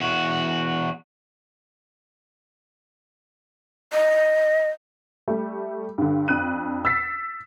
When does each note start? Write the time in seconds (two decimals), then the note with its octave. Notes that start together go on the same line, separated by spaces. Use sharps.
0.01 E2 F#4
3.93 D#5
5.28 G3 A3
5.98 G2 D3
6.28 F2 D4 F#6 D#7
6.85 E6 A6 B6 C7